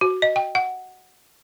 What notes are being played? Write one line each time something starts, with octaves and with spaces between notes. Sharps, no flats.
F#4
D#5
G5
F#5